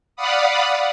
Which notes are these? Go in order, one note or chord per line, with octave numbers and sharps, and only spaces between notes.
D5 F5 F#5 B5 D#6